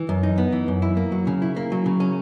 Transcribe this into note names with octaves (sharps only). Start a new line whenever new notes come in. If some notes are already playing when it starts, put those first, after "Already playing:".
Already playing: E3
F#2
D#4
B3
E3
F#2
E4
A#3
F#3
C#3
E4
A#3
F#3
C#3
C#4